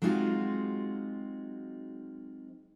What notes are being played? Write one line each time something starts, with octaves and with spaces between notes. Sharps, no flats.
F#3 G#3 C4 D#4 F4 F#4